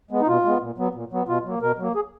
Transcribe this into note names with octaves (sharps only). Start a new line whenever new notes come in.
G#3 B3
D#4
B2 F4
G#3 B3
A#2
F#3 B3
A#2
F#3 B3
B2 F4
F#3 A#3
B2 A#4
F#3 A#3
G#4